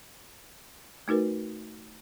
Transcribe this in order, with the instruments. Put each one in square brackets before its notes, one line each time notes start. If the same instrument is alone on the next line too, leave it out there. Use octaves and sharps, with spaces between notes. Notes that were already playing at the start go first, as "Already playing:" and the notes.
[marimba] A3 D#4 F#4 A#4 B4